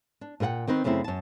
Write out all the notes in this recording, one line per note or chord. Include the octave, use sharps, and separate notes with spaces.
D4
A#2 G#4 A#4 F#5 G5
D#3 C4 D#4 B4
F#2 C#3 A3 C4 E4
F#2 A5